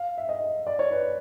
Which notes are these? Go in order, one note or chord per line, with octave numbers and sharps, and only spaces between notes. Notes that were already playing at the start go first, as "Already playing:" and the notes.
Already playing: F5
E5
D#5
D5
C#5
B4